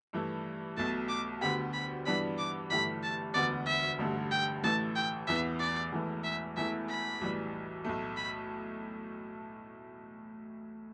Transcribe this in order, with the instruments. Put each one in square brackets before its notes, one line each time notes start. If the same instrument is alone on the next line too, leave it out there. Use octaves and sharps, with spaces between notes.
[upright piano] G2 E3 A3 E4
[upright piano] B1 B2 A3 [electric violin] A5
[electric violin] D6
[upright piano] D2 D3 B3 G4 [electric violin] B5
[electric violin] B5
[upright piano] G2 E3 G3 B3 D4 [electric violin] B5
[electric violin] D6
[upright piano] G1 G2 E3 A3 G4 [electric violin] B5
[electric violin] A5
[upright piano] E1 D2 D3 B3 [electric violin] D5
[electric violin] E5
[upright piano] A1 G2 D3 A3
[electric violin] G5
[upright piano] A1 A2 E3 A3 [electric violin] A5
[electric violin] G5
[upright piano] E2 E3 B3 [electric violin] E5
[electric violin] D5
[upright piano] E1 E2 E3 A3
[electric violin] E5
[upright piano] E1 E2 E3 A3 E4 [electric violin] E5
[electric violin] B5
[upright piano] B1 A2 E3 G3
B1 A2 A3
[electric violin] B5